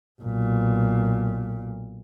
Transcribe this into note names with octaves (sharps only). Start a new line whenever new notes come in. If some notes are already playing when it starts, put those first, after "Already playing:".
B1 A#2